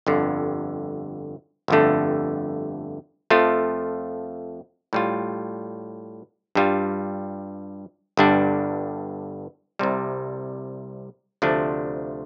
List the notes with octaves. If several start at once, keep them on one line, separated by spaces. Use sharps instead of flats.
G1 F2 D3
G1 F2 D3 A3
F2 F3 A3 F4
A2 G3 F4
G2 G3 F4
G1 G2 G3 D4
C2 C3 G3
D2 C3 F3 A3 D4